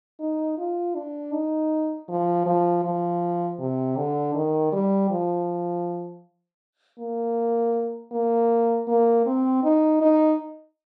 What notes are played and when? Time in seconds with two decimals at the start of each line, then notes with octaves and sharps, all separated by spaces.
0.20 D#4
0.58 F4
0.95 D4
1.33 D#4
2.08 F3
2.46 F3
2.84 F3
3.60 C3
3.97 D3
4.35 D#3
4.72 G3
5.10 F3
6.99 A#3
8.12 A#3
8.88 A#3
9.26 C4
9.64 D#4
10.01 D#4